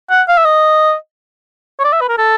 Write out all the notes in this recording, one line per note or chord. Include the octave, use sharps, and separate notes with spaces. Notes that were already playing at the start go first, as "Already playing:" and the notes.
F#5
F5
E5
D#5
C#5
D5
E5
B4
A#4
A4